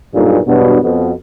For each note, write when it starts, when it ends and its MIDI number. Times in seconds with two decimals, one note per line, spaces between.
0.14 0.39 35
0.14 0.39 43
0.14 0.39 46
0.47 0.78 40
0.47 0.78 43
0.47 0.78 47
0.47 0.78 54
0.47 0.78 59
0.47 0.78 62
0.83 1.11 41
0.83 1.11 47